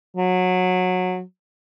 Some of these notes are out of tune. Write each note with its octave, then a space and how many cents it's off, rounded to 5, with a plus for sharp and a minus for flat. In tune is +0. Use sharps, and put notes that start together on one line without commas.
F#3 -20